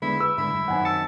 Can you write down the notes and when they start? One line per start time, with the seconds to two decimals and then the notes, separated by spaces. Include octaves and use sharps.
0.02 D3 G#3 B3 E4
0.21 B4 E6
0.37 G#2 D3 E4
0.54 G2
0.68 F#2 D#3 C4 F#5 G#5
0.85 A5 E6 C#7